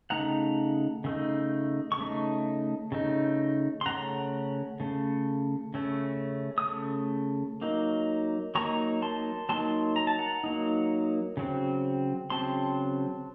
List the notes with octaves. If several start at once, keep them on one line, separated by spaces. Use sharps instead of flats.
C#3 A3 D#4 F#5 A#5
C#3 A3 D#4
C#6
C#3 A3 D#4
C#3 A3 D#4
C6
C#3 A3 C#4 F#5 A#5
C#3 A3
C#3 A3 C#4
D#6
C#3 A3
F#3 A#3 D#4
F#3 A#3 D#4 A#5 C#6
A5 C6
F#3 A#3 D#4 A5 C6
A#5
A5
F#5 A#5
F#3 A#3 D#4
C#3 F#3 C4
C#3 F#3 C4 A5 C6